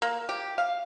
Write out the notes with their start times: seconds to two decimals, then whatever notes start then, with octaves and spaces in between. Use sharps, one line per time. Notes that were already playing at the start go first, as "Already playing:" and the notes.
0.02 A#3
0.29 G4
0.58 F5